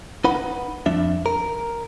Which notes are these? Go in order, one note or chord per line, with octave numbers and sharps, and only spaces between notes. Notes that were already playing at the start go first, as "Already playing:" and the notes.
D#4 B4 F#5 B5
F2 D4 E5
A#4